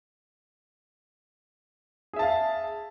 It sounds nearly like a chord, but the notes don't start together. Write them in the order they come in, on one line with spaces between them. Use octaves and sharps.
G#4 E5 A5 F5